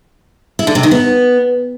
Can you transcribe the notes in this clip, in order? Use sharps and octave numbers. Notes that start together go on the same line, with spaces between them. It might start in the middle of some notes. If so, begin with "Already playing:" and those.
E4
D3
C3
D#3
B3